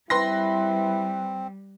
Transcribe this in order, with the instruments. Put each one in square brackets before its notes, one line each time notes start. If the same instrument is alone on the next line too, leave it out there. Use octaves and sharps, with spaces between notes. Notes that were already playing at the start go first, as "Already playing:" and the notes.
[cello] G3 [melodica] C4 [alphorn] E4 [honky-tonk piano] B4 C6 A#6